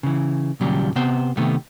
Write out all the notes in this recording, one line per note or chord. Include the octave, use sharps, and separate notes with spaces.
C#3 E3
D#2 A#2 C#3 F#3 G3
C3 B3 C5
C3 D#3 A3 B3